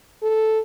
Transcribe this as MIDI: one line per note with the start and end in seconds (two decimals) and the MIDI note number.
0.22 0.60 69